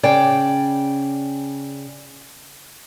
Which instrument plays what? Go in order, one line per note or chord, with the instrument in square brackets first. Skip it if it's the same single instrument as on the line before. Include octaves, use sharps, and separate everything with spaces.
[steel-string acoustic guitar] C#3 D5 G5